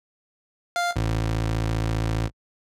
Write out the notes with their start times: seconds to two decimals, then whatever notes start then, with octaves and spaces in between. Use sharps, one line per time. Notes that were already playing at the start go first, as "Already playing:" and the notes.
0.76 F5
0.96 A1